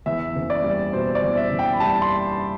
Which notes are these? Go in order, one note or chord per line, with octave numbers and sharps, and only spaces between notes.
E2 E5
F#1
D5
G3
B2 C5
D5
E2
E5
F#1
G5
B5
G3 A5
C6